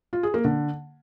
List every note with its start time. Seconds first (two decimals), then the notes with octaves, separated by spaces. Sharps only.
0.13 F4
0.23 G#4
0.34 A#3
0.45 D3